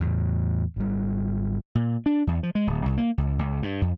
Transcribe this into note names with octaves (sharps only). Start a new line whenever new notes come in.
E2 A2
G#1 G3
A#2
D4
E2
F3
G#3
D1
C2
A#3
C#2
C#2
G2
F2